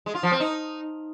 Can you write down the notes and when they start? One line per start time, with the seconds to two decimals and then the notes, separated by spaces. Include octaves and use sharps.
0.06 G#3
0.15 F4
0.23 F3
0.32 C4
0.40 D#4